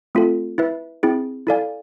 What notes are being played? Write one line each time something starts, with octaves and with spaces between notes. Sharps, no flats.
A3 C4 F4 A4
E4 B4 E5
C4 E4 G#4
E4 A4 D5 F5 G#5